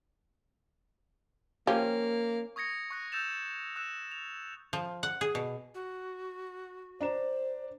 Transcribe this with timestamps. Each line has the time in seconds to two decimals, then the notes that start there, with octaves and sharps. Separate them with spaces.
1.67 F3 A#3 C#4 G4
2.56 C#6 D#6 G#6 A#6 C#7
2.90 C#6 F#6 A#6
3.12 E6 G6 A6 E7 F7
3.76 E6 F#6 E7
4.12 F7
4.73 F3
5.03 F#5
5.21 G#4
5.35 B2
5.75 F#4
7.01 D4 C5 A#5 E7